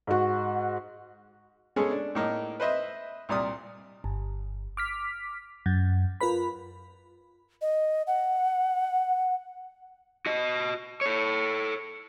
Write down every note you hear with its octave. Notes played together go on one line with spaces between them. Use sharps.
G#2 F#4
G#3 B3 C#4 G#4 A4
D4
A2 A#3 D#4
B4 C5 D#5 E5
C2 A#2 D5 D#6
G1
D6 F6 B6
F#2
F4 A#4 B4 B5
D#5
F#5
F#4 D#5
A4 C#5